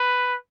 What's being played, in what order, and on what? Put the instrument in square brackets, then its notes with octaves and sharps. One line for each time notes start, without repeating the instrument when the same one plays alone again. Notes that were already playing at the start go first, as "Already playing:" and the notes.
Already playing: [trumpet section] B4